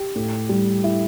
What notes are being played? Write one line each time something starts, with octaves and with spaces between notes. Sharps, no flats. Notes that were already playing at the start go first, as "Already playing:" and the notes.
Already playing: G4
A2
G3
E4